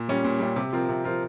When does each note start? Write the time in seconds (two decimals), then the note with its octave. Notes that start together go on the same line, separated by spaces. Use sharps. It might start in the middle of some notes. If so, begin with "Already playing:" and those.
Already playing: A#2
0.09 G3 C#4
0.24 A#2
0.40 G3 C#4
0.56 C3
0.73 F3 C4 F4 A#4
0.89 C3
1.04 F3 C4 F4 A#4